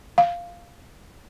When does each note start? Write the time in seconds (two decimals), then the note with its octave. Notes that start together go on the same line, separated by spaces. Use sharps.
0.18 F5